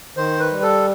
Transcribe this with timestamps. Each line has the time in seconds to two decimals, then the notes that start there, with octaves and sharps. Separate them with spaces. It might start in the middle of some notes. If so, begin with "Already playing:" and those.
0.17 D#3 C5
0.40 B4
0.52 G3
0.62 A4